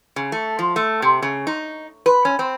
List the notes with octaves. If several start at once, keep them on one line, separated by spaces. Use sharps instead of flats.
C#3
A3
F3
A3
C3
C#3
D#4
B4
C#4
C4